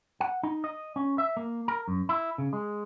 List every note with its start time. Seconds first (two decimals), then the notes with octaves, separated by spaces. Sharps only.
0.20 F#5
0.43 D#4
0.64 D#5
0.96 C#4
1.18 E5
1.37 A#3
1.68 A#4
1.88 F#2
2.09 E4
2.38 C#3
2.53 G#3